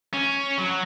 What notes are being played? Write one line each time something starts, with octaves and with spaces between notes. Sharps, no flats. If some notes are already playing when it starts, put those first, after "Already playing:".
C#4
F#3